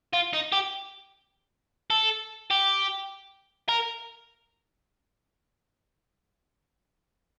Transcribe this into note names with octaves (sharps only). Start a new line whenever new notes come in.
F4
D#4
G4
A4
G4
A#4